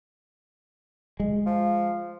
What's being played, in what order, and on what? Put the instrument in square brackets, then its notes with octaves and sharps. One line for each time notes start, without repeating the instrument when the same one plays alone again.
[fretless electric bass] G#3
[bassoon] F3